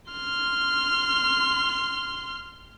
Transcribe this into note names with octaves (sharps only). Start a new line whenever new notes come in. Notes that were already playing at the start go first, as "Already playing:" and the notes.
C6 F6